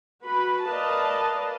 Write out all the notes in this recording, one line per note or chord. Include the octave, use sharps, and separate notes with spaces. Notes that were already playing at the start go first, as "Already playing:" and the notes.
F#4 B4 B5
A#4 B4 D5 D#5 F5 A5